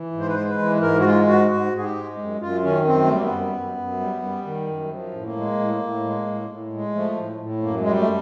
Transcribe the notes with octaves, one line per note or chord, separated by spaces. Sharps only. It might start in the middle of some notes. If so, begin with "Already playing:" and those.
Already playing: E3
G#2
C5
B4
G#3 C5
B4
E3
G#2 A#4
F#4
G#3 F4
G#2 F#4
G#2 F#4
G#2 G#4
G4
G#3
F#2
F#2 F4
D#3 C#4
F#2 C4
A3
G3 A#3
B3
F#2
F#2
F#2
G3
G3
D#3
F#2
F3
A2
A#3
G#3
A2
A2
G#3
A2
A2
G#3
F3 A3
A2
A2
F#2 A#3
G#3
G3
A3